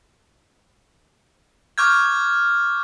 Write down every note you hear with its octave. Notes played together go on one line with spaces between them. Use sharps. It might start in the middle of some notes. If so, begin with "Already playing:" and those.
C#6 D6 F6 G6 G#6